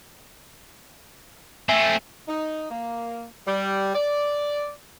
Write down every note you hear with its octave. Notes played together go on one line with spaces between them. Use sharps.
A3 C4 E5 G#5
D#4
A#3
G3
D5